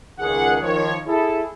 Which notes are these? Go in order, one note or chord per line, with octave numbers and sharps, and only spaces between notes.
C#2 D#3 G#4 F#5
D#3 F3 C#5
E4 G#4 A4